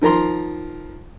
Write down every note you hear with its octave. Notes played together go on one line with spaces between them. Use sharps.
D#3 F3 A#4 A#5 C6